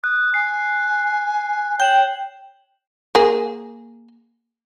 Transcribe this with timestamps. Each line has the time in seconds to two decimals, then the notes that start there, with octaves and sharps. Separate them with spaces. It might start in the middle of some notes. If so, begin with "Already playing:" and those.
0.04 D#6 F#6
0.34 G#5 C7
1.80 C#5 G5 G6 E7 F#7
3.15 A#3 G#4